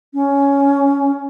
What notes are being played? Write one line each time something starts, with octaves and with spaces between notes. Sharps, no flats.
C#4